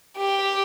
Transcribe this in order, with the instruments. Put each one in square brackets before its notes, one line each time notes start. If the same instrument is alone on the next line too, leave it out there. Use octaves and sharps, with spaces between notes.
[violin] G4